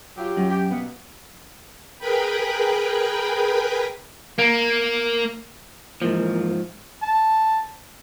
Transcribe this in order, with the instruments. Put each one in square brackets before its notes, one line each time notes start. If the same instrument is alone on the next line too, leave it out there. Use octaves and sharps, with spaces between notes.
[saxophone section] F#3 F4 G4
[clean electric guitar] F#2
[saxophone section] G4
B2 A#3 B3
[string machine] G#4 A#4 B4 G5 B5
[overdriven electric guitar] A#3
[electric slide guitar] G#2 F3 [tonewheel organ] E3 A#3
[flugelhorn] A5